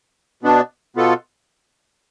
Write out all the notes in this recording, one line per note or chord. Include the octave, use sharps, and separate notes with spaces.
B2 B3 D4
B2 B3 F4 A4